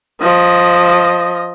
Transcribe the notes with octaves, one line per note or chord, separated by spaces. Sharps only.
F3 D#5